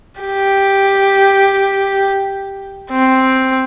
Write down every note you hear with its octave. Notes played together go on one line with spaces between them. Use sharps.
G4
C4